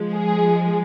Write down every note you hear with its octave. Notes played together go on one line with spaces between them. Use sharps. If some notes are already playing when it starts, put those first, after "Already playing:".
Already playing: F3 G#3
G#4